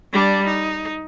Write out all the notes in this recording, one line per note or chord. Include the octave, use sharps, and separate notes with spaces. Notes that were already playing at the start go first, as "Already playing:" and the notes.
G3 D4
D#4